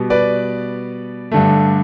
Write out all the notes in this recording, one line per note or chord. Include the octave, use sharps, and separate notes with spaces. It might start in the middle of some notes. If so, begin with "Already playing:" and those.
Already playing: B2 G3 B3
B4 D5
G2 D3 A3